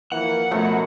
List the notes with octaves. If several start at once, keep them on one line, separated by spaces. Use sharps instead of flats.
E3 F3 A#3 F#5
F#2 B2 F3 F#3 A3